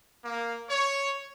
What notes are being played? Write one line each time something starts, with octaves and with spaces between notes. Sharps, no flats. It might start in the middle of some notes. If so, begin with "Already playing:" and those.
A#3
C#5